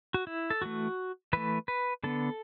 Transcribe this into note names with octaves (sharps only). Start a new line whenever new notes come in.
F#4
E4
A4
E3 A3 F#4
E3 A3 B4
B4
D3 B3 A4